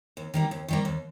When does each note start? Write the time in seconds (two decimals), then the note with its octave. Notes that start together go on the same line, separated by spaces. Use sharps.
0.17 D#2
0.34 D#3 G3 A#3
0.51 D#2
0.68 D#3 G3 A#3
0.85 D#2